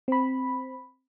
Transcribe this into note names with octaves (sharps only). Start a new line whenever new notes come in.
C4 B5